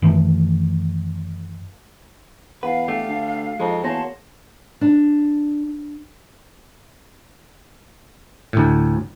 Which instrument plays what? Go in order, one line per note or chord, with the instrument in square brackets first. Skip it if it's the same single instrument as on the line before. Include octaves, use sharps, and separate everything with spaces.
[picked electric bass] F#2 D#3 E3 A3
[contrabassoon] E2 [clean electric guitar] B4 [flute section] F5 [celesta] F#5
[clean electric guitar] A3 D4 G4
[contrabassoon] D2
[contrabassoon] F2 [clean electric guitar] G#3 C4 D#4
[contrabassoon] E2 [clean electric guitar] A#3 F#4 [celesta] C#5 A#6 [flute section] A5 C6
[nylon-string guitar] D4
[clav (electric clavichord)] D2 A2